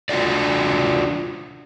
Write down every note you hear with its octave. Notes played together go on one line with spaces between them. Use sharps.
D4 F4 F#4 D5